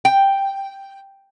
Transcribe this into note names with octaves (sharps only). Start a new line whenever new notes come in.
G5